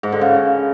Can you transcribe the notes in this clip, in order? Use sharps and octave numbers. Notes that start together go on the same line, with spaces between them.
G#2
D3
C#3